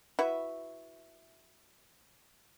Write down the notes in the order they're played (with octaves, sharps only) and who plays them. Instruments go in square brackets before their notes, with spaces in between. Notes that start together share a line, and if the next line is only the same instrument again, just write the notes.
[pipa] E4 F#4 B4 E5